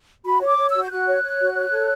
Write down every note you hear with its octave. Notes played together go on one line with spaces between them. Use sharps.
F#4 B5
C#5
D6
C#5
E6
F#4
G6
F#4 F#6
C#5
C#5
F#4
C#5
A4